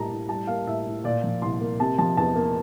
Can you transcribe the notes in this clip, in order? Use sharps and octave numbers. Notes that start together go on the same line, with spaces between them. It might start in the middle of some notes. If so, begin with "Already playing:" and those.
Already playing: A2 G3 A#3 A5 A#5
A2
G3 A5
A#3 F5
A2 E5
A2
A#2 D5
F3
C2 C6
A#3
C3 A5
F3 A5
E2 A5
A#3